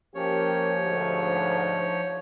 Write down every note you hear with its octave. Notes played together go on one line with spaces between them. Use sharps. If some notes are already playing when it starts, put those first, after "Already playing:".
F3 A#3 C#4 G4 C#5
D2 G#2